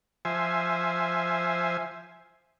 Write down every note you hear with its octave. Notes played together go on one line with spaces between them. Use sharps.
F3 C5 E5 G#5